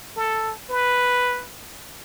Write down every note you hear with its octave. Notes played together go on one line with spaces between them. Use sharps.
A4
B4